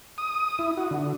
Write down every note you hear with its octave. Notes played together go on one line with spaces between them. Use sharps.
D#6
E4
F#4
D3